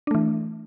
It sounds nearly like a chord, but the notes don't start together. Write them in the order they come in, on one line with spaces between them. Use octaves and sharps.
D4 A3 E3